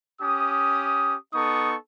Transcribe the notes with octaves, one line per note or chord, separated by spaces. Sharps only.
C#4 G4 D#6
B3 D#4 A4 C#6 D#6